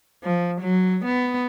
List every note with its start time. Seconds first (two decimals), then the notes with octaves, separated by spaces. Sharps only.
0.23 F3
0.61 F#3
1.05 B3